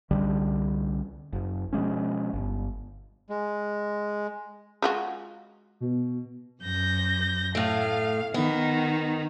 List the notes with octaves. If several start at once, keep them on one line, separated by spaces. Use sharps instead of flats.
C2 D3 G3
F#1
B2 F3 G#3 C#4
G1
G#3
G#3 F4 F#4
B2
F#2 G6 A#6
A2 A3 F5
D#3 B3 D#4